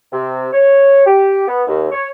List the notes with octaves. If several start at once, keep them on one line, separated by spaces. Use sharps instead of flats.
C3
C#5
G4
B3
D#2
C#5